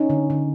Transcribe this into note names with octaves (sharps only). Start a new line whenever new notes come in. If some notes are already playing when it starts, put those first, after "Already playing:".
Already playing: C#4 D#4
D3
D3